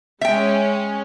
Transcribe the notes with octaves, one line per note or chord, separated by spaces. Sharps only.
G#3 C#4 E5 G5